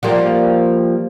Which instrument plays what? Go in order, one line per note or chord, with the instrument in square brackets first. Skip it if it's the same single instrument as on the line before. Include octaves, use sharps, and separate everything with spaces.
[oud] F3 G3 A#3